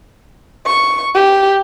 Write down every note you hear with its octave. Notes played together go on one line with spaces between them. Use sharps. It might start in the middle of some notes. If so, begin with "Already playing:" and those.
C#6
G4